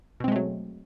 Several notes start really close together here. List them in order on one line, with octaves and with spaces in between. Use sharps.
B2 C4 G#3 A3 F#3